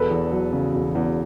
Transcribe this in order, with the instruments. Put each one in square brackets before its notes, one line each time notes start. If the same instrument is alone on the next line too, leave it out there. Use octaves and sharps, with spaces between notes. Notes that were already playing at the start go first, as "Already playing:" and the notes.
Already playing: [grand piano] E1 A4 B4
E2
F#3
C#3
E1
E2